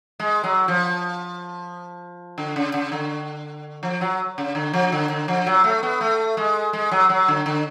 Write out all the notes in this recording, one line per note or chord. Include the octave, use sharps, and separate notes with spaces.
G#3
F#3
F3
D3
C#3
C#3
D3
F3
F#3
C#3
D3
F3
D3
D3
F3
F#3
A3
B3
A3
G#3
G#3
F#3
F#3
D3
D3